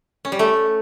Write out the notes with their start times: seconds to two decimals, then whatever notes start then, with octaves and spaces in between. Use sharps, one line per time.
0.25 C#4
0.32 G3
0.39 A3